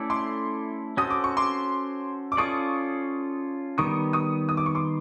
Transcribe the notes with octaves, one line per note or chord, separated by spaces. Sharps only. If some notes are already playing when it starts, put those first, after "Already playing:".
Already playing: A3 C#4 E4 A4 D5
C6 D6
C#4 F#4 A4 C5 D#6
D6
C#6
C6 D6
D6
C#4 F4 A4 D5 C#6 D#6
D#3 G3 B3 C#6 D#6
C#6 D#6
D#6
D6
C#6
C6 D6